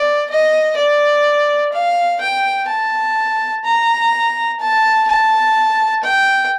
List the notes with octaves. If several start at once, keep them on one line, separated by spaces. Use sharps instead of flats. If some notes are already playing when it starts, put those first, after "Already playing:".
Already playing: D5
D#5
D5
F5
G5
A5
A#5
A5
A5
G5